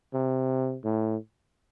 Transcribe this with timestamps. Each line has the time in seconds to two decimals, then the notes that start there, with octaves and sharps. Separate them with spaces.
0.14 C3
0.84 A2